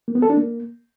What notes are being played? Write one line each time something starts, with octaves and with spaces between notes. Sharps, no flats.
A#3
B3
A4
D4
A#3